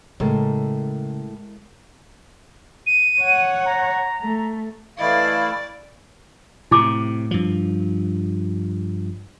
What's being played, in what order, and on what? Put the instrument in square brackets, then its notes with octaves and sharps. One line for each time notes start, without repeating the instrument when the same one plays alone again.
[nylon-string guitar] A2 [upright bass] C#3 [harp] G#3 A4 A#4
[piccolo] D#7
[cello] C#5 F#5
[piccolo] A#5
[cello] A3
[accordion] E3 A3 E4 [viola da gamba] D5 [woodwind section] D#5 F5
[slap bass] A2 C3 [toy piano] E4 D6
[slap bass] G2 F3